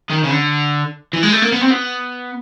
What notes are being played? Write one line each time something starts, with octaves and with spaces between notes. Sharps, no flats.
D#3
C#3
D3
E3
G#3
A3
A#3
B3
C4
B3